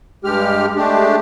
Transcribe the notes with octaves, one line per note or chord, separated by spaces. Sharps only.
G2 G#3 G4 F6
G#3 A3 D4 G4